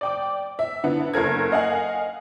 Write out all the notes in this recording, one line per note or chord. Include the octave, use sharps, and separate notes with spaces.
D5 G5 D6
E5
D3 B3 E4
F#1 A4 A#4 G#6
D#5 F5 F#5 G#5